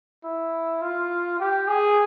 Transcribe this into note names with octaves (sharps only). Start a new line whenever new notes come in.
E4
F4
G4
G#4